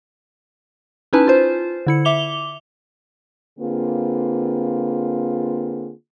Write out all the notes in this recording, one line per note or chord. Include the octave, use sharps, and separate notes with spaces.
C#4 D#4 E4 B4 G#5 A5
F4 C5
D3 E4 C#7
E5 D6 F7 G7
D3 A#3 C4 F4 G#4 B4